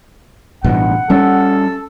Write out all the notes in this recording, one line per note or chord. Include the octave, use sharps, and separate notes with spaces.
A1 G2 B2 F#5
G3 C#4 A4